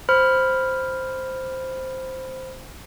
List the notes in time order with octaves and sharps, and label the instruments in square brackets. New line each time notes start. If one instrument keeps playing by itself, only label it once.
[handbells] C5 B5 F6